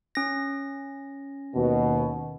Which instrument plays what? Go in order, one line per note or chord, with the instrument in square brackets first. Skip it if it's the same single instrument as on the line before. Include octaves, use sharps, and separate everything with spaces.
[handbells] C#4 A#6
[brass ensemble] D#2 B2